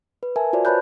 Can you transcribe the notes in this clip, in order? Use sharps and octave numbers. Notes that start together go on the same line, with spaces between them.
B4
A#4 E5 G#5 A5
F4 F#4 C5 D5
B4 C#5 A5 B5 F#6 G6